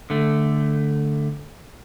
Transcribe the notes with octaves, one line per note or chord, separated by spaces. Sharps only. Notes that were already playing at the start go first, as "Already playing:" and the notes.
D3 A3